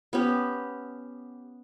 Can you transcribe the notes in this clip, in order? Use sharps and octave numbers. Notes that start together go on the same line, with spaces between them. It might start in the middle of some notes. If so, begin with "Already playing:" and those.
B3 C#4 G4